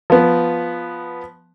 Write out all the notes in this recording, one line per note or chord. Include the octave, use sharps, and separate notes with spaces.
F3 B3